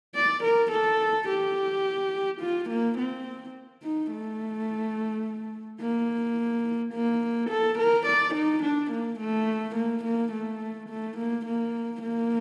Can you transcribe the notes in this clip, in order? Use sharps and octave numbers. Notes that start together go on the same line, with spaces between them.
D5
A#4
A4
G4
F4
A#3
C4
D#4
A3
A#3
A#3
A4
A#4
D5
D#4
D4
A#3
A3
A#3
A#3
A3
A3
A#3
A#3
A#3